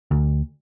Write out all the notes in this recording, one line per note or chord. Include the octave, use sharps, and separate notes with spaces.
D2